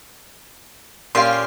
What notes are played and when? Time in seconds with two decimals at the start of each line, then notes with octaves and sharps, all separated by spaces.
1.15 A#2 C#4 G4 F5 C6